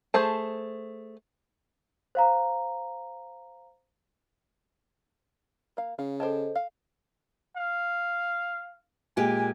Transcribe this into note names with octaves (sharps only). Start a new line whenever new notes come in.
A3 G#4 C5 A5
C5 F5 A#5
A#3 F5
C#3 F5
A4 C5 D#5 G5 A5
F5
F5
A#2 G#3 G4 G#5